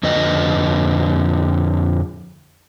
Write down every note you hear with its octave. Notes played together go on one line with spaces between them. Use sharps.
F2 D3 B4 D#5